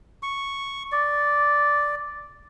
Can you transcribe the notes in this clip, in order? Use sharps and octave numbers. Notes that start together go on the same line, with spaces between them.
C#6
D5